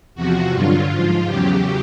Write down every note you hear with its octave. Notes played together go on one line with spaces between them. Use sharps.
E2 C3 F3 F#4
G2 D3 F#3 F4
G#2 F3
E2 C#3 F#3 G4